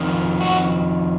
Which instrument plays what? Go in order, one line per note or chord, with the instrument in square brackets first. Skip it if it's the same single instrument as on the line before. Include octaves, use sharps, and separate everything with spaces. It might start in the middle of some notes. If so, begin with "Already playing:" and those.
Already playing: [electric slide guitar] F2 D#3
F#4